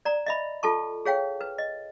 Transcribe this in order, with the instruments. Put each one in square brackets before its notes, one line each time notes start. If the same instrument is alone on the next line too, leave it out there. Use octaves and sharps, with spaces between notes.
[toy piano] D5 A#5
D#5 E5 B5
F4 A4 A5 C#6
G#4 C#5 F5 G5
B4
D#5